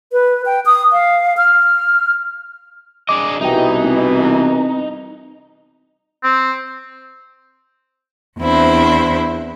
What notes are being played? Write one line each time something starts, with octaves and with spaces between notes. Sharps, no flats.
B4
G5
D#6
F5
F6
D4 G#4 D#5 D6
C2 B2 E3 D#4 E5 G5
C4
C4
E2 C4 D4 E4 C5